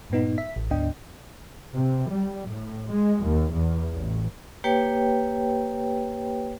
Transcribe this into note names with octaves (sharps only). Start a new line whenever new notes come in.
G2 A#2 B3 D#4
E5 B6
A1
D2 G#2 B3 D4 D#5 G5
C3
G3
A2
G#3
D#2
E2
A1
A#3 G4 B4 C#5 G5